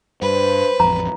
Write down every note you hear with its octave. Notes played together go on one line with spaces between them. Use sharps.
G2 B4 C5
A1 F2 A#5